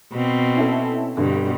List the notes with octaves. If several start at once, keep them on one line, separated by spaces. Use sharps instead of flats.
B2 C4
C#4 E4 A4
G1 G2 B2 D3